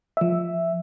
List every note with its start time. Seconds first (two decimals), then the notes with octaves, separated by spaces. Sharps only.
0.17 F3 E5